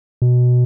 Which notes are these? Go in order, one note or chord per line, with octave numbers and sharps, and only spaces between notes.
B2